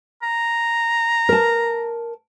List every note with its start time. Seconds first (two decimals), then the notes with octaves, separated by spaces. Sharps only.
0.23 A#5
1.29 A#4 A5